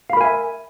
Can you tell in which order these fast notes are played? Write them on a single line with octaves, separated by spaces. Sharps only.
F5 B5 A#4 G#5 E5